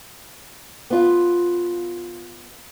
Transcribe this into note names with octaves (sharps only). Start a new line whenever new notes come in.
B3 F4